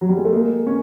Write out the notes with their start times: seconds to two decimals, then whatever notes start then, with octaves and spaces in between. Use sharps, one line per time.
0.01 F#3
0.09 G3
0.17 G#3
0.25 A3
0.33 G#3 A#3
0.67 C#4